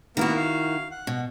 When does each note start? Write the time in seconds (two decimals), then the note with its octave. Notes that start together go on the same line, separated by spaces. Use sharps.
0.17 D#3 A#3 B3 E4 F#4 A#4
0.36 F5
0.91 F#5
1.07 B2